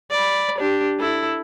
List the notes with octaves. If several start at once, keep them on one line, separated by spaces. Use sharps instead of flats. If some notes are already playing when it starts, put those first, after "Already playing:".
D5 B5
D4 G4
E4 A4